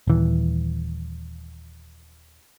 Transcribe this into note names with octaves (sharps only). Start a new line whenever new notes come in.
D#1 E3